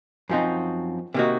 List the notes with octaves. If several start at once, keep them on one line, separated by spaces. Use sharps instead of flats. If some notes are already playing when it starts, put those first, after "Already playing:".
F#2 F3 C4 D#4 F#4
C3 D#3 A#3 D#4 F#4